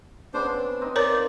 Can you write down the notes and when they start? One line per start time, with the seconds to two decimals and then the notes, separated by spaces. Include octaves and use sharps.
0.34 C#3 B3 D4 C5 D6
0.54 C4 D4
0.81 C4 D#4
0.96 A#4 C#5 D5 A#5
1.10 F5